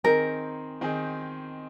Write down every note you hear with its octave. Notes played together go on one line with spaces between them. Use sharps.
D#3 C4 D#4 G#4 A#4
D#3 C4 D#4 G#4